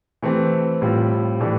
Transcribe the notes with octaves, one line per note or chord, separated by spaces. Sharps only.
E3 A3 C4 G4
A2 G3 C4 F4
A2 E3 A3 D4 G4